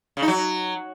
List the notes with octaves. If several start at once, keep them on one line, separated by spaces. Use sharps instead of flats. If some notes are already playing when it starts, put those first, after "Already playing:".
C#3
D#4
F#3